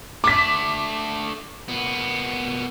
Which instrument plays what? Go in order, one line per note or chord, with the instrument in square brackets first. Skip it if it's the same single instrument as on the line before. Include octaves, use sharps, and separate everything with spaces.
[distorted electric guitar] A3 D4 [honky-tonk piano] D6 B6
[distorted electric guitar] A#2 B3